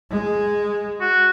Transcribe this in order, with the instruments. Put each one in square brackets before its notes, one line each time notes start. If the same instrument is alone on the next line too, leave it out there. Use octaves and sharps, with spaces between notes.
[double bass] G#3
[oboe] F#4